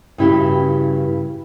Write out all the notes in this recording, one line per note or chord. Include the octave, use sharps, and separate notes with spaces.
G2 C#3 E4 F#4 G4